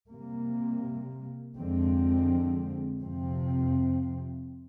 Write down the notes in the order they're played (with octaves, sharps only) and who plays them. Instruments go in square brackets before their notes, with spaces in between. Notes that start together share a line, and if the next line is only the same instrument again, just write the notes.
[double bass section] C3 G3 A#3
F2 D3 F3 G#3 C4
F2 C3 F3 C4